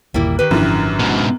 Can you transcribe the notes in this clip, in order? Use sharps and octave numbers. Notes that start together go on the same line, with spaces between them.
G1 D#2 A#2 G3 A#3 E4
D#3 G4 B4
G#1 F#2 D3 E3 F3 D4
G#2 B2